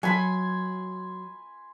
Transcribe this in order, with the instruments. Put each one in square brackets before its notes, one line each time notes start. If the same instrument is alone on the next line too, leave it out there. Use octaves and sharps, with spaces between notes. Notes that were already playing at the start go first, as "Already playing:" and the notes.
[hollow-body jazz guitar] F#3 [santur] G#5 B5 C6